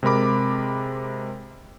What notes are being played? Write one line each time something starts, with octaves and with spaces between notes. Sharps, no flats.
C3 G#3 A#4 B5 D6